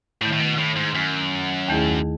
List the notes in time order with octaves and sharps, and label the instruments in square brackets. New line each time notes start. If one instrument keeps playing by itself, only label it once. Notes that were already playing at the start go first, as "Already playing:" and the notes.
[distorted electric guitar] A2 [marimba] D#3 A3 E4
[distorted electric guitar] A2
B2
A2
G#2
F#2
[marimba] D#2 D#3 A3 E4 G#4